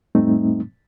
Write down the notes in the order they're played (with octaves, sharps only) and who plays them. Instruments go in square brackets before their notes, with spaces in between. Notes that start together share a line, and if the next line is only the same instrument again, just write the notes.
[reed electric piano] F2 A2 G3 A3 C4 D#4